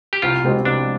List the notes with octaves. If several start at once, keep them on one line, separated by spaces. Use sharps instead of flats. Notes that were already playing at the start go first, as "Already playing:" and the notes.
G4
C2 F4
B2 G#3 C4 G4
C2 D4